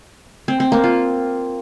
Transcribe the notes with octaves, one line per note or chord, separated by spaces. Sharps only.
C4
C4
A#3
F4